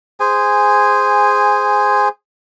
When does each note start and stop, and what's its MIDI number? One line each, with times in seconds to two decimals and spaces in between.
0.20 2.09 68
0.20 2.09 72
0.20 2.09 80